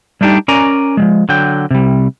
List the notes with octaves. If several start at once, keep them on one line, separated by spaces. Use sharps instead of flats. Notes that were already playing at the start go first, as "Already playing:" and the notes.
G3 A3 D4 D#4 G4
C#4 A#4 D5 G#5 A#5
F3 G3 G#3
D3 F#3 G5
C3 G3